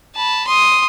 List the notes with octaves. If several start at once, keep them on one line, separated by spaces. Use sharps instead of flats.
A5 B5
C6 D#6